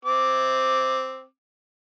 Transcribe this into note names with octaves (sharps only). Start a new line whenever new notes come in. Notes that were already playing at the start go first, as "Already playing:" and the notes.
C4 D6